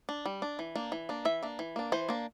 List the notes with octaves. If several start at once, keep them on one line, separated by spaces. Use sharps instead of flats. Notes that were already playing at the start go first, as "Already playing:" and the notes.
D4
G3
D4
E3
A#3 D4
E3
A#3 D4
E3 E5
A#3 D4
E3
A#3 D4
E3 C5
A#3 D4